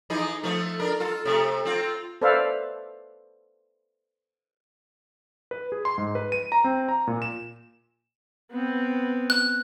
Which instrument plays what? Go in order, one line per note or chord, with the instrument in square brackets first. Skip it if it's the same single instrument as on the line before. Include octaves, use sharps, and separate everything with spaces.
[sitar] E3 D#4 G#4
F3 A3
D4 A#4
F4 A4
C3 A3
C4 F4
[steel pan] A4 B4 C5 D5 E5 F5
[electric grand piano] B4
G#4
C6
G#2
B4
D#7
A#5
C4
A#5
A#2
E7
[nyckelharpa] B3 C4
[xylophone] F#6